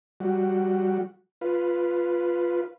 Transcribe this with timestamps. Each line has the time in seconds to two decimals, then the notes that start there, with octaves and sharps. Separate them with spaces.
0.20 G3 F#4
1.41 F4 B4